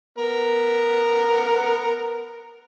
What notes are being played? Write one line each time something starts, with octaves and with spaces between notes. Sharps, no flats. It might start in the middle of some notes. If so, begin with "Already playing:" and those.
B3 A#4